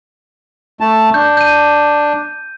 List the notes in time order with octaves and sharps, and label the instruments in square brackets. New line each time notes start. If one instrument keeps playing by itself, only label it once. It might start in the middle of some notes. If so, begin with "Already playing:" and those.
[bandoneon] A3 A5
[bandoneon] D4 [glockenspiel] G6
[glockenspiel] G6 D#7